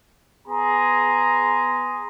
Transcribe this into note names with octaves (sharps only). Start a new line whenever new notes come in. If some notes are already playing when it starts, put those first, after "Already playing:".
B3 G#4 A#5 C6